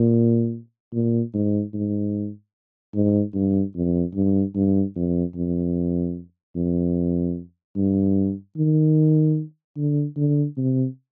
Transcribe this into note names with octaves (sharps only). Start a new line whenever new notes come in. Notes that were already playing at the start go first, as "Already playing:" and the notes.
Already playing: A#2
A#2
G#2
G#2
G#2
G2
F2
G2
G2
F2
F2
F2
G2
D#3
D3
D3
C3